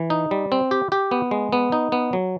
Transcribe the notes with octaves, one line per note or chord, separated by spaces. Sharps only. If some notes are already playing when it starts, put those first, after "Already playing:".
Already playing: E3
D#4
G3
C4
G4
G4
B3
G#3
B3
D#4
B3
F#3